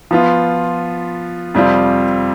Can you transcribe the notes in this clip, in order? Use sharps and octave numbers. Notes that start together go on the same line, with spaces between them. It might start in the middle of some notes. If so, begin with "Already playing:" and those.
F3 B3 F4
F2 C3 G3 C4 F4